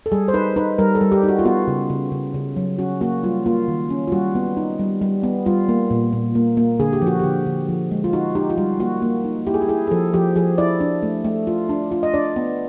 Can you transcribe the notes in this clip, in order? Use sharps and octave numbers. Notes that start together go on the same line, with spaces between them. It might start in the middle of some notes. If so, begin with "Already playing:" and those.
A4
G3 G#4
C5
D#4 B4
D#4 B4
G3 A#4
A4
G3
G4
D#4
F#4
F4
B3 F#4
C#3
C#3
C#3
C#3
F#3
C#4 F#4
A#3 F#4
G3 F4
A#3 F4
D#3
C#4
F4
G3 F#4
B3
D#4
G3
G3
B3
G3 F4
A#3
A#2
A#2
A#3
A#3
D3 G#4
G4
F3 F#4
D3 G4
D3
F3
G#3
F4
D#4 F#4
D#4 G4
F4
G3 F#4
A#3 F#4
A#3
D#4
E4 G4
G#4
G4
E4 G#4
G#4
F3 A4
F3 G4
F3 G#4
E4 D5
D4
A3
A3
F4
D4
F4
D#5
D4 D5
B3